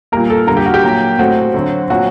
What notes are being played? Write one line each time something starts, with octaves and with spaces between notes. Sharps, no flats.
A#2 G3 A#3 A#4
A4
D3 G3 A#3 A#4
G4
F#4
G4
A#2 F#3 A#3
A2 A3 C4 F#4
D3 F#3 C4
A#2 F#3 C4 F#4